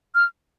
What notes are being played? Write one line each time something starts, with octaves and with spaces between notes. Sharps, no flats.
F6